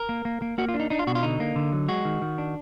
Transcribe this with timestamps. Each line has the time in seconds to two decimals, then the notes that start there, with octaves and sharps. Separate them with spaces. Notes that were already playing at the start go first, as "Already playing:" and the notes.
Already playing: A#4
0.09 A#3
0.25 A#3
0.42 A#3
0.58 A#3 F#4
0.69 F4
0.74 D4
0.80 D#4
0.90 D4 D#4
0.99 F4
1.07 B2 F#4
1.15 F4
1.23 D3 D#4
1.40 A#3
1.56 D3
1.73 F#3
1.88 G#3 F#4
2.05 D#3
2.22 D#3
2.38 D4